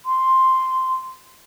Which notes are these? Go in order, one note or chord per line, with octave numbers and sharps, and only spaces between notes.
C6